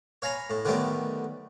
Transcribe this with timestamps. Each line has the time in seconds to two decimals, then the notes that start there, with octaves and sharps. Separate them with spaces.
0.22 C#5 F5 G#5 A#5 B5
0.50 A2
0.65 D3 D#3 F#3 G3 A3 B3